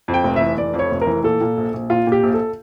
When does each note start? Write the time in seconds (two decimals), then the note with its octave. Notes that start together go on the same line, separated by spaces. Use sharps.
0.08 F2
0.14 G5
0.24 F1
0.36 E3 E5
0.58 F1 D5
0.74 F2
0.79 C#5
0.91 F1
1.01 A#4
1.07 E3
1.24 A#2 A4
1.41 A#2
1.57 A#1
1.74 A#1
1.90 A#2 F4
2.07 A#2
2.12 G4
2.23 A#1
2.34 A4